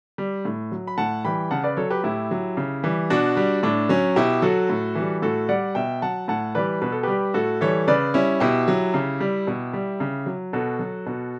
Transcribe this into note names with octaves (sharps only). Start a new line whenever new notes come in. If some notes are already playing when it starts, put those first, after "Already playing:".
G3
A2
F#3
B5
A2 F#5 A5
E3 G3 G5 B5
C#3 F#5 A5
B4 D5
F#3 A4 C#5
G4 B4
A2 E4 G4
F#3
C#3
E3 G3
B2 D4 F#4
G3
A2 D4
F#3 C#4
B2 E4 G4
F#3 F#4 A4
A2
E3 G3
A2 F#4 A4
G3 D5 F#5
B2 E5 G5
F#3 F#5 A5
A2 F#5 A5
E3 G3 B4 D5
B2 B4
A4
G3 G4 B4
A2 F#4 A4
E3 G3 A4 C#5
C#3 B4 D5
G3 C#4 E4
B2 E4 G4
F#3
C#3
G3
B2
G3
C#3
F#3
B2 F#4 A4
F#3
B2